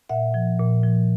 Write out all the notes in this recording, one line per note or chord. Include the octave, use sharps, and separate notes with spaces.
A#2 E5 F#5
F3
A#2
F3